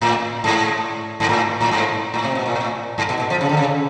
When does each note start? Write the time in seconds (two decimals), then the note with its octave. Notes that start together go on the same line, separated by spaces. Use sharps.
0.01 A2
0.44 G#2
1.20 G#2
1.29 A2
1.61 A2
1.71 G#2
2.14 A2
2.25 C3
2.35 B2
2.46 A#2
2.56 A2
2.98 G#2
3.09 B2
3.20 B2
3.30 F3
3.41 C#3
3.49 D3
3.57 C#3